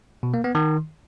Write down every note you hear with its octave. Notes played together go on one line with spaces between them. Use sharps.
B2
A#3
B3
D#3